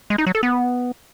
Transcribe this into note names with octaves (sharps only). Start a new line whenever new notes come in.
G#3
D#4
F#3
A4
B3